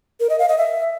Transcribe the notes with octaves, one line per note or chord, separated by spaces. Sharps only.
A#4
D#5
F5
D#5
E5